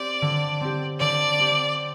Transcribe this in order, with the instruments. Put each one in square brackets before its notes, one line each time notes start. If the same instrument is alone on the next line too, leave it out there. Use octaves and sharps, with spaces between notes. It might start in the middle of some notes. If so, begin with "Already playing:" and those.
Already playing: [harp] C4 G4 [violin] D5
[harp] D3
C4 G4
[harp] D3 [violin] D5
[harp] C4 G4